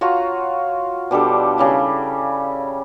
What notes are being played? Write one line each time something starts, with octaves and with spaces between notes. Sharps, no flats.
F4 F#4 C#5 A#5
B2 G3 D4 A4
C#3 G3 E4